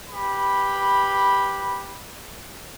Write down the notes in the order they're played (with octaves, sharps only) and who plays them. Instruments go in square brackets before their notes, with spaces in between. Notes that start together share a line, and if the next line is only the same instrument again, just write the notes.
[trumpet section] G4 B4 B5